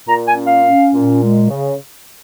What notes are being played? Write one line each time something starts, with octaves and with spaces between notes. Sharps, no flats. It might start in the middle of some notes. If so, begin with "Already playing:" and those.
A#2 A#5
G#5
C#4
F5
C#4
A#2
G#3
C#3